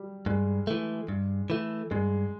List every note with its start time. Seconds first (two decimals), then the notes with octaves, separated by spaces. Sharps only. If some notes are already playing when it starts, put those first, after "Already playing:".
Already playing: F#3 G3
0.26 G2 G#3
0.67 E3 A3
1.08 G2
1.50 E3 A3
1.91 G2 G#3